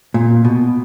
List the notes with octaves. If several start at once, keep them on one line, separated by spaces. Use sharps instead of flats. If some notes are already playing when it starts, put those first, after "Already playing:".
A#2
B2